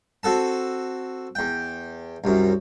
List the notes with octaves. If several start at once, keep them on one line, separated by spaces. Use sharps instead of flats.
C4 F#4 A4 A5
E2 G5
C2 F#2